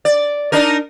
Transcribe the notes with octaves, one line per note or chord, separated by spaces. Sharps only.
D5
D4 D#4 A#4